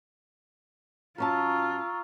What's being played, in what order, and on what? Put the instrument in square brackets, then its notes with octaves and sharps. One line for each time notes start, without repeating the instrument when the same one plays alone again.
[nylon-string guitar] F#2 C#4 A5 [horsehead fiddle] F4 [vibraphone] A#5 C#6 E6